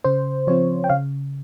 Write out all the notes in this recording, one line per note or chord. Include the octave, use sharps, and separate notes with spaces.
C#3 C5
F3 C4 F4 C#5
G5
C#3 F5